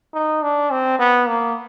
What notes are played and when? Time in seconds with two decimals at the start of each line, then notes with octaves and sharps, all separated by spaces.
0.14 D#4
0.43 D4
0.71 C4
0.99 B3
1.28 A#3